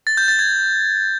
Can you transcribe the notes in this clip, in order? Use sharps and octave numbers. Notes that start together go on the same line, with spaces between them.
A6
G6
A6
G#6